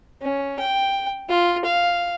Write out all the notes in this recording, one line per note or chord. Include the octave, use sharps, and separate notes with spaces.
C#4
G5
F4
F5